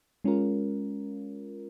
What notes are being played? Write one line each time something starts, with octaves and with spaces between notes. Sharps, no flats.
G#3 C#4 F4 A#4